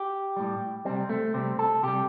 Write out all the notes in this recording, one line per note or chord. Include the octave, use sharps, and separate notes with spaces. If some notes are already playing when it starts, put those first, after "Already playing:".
Already playing: G4
A2 G3
C3 G3 C4
A3
C3 G3 C4
A4
C3 G3 G4